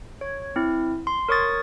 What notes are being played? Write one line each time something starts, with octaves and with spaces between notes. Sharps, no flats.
C#5
C4 E4
C6
A#4 C#5 C#6 D#6 A6